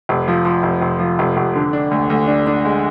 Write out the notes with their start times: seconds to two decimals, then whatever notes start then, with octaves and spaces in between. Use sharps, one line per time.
0.09 F1
0.28 F3
0.45 F3
0.63 F1
0.82 F1
1.00 F3
1.19 F1
1.37 F1
1.55 D3
1.73 D4
1.91 D2
2.10 D2
2.28 D4
2.47 D4
2.65 G#3